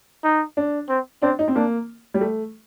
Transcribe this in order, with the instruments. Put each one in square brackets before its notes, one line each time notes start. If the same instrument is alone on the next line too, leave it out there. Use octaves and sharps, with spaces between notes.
[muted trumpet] D#4
[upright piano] D4
[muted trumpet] C4
[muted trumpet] C4 [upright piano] D4
[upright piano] D#4
C4
[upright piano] A#3 [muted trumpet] D4
[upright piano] G3
A3